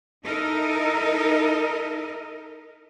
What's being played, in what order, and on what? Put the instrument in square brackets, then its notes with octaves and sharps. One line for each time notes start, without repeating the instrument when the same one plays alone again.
[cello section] D#4 E4 A4 A#4 D#5 E5